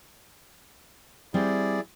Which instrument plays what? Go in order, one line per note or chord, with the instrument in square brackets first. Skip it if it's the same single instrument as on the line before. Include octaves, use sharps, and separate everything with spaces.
[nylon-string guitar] G3 C4 [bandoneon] E4 G#4 D5